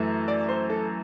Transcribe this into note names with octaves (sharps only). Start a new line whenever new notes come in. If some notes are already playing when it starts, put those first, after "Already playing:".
Already playing: F#2 E3 A3
D5
C5
A4